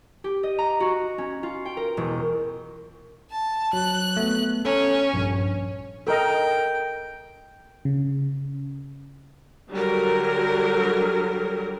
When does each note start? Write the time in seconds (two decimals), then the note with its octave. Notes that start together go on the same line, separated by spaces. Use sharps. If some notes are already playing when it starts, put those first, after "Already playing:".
0.24 G4
0.43 D#5
0.58 A#5
0.80 F#4
1.18 C#4
1.43 F4
1.65 G5
1.77 A#4
1.97 E1
3.31 A5
3.73 F#3 F#6
4.17 A3 B3
4.65 C#4 A4 A#5
5.14 A#1 G2 G#5
6.07 A4 A#4 D#5 G5
7.85 C#3
9.70 D3 F#3 G3 A#4